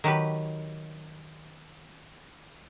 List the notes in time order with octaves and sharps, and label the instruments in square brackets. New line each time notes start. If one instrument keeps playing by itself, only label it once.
[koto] D#3 F#3 G4 B4